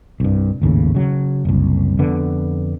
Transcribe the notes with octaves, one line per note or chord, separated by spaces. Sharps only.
C2 G2
G#1 D#2 A2 C#3
C#3 F#3
F#1 C2
F2 D3 B3